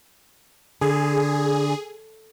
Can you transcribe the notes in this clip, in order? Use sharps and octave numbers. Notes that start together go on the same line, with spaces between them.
D3 G#4